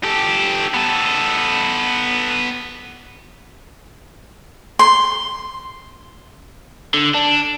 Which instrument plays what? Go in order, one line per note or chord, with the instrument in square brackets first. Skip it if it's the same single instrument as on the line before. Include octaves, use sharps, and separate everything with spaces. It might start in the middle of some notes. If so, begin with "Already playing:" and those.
[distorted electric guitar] G4 A4
B3 A4
[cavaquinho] C6
[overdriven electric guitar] D3
D4